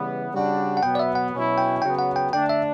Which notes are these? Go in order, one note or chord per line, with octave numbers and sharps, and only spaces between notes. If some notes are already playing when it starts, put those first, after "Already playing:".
Already playing: C#3 E3 G3 B3 F#5
C#3 G3 D4 F#4
F#5
B2 F#3 B3 G5
D5
E5
F#5
B2 F#3 C#4 E4
G5
C#3 F#3 B3 G5
F#5
G5
D3 A3 D4 G5
E5